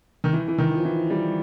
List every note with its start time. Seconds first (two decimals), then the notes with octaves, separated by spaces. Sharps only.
0.24 D#3
0.33 E3
0.48 E3
0.58 D#3
0.75 F3
0.85 E3
1.10 G3